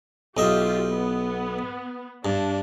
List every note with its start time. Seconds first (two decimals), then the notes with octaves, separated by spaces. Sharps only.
0.37 B1 F4 G4 D#5 E5
0.91 B3
2.25 G2 D4